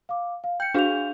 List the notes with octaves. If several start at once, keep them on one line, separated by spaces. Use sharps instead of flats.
F5 D6
F5
G5 G6 C#7
D4 F#4 G#4 F5 G6 F7